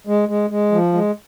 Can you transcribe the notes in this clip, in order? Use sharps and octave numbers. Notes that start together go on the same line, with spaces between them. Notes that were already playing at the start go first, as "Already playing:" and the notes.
G#3
G#3
G#3
F3
G#3